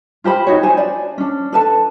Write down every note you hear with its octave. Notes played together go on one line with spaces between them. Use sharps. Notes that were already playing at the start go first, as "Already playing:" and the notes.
F4 G4 C5 B5
D#4 F#4 G4 C#5
C5 G#5
D4 D5
C#4 D4
A4 B4 A5